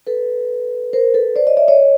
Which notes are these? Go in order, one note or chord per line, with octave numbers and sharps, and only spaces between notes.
A4 B4
A#4 C5
A4 B4
C5 D5
C#5 D#5
D5 E5
C#5 D#5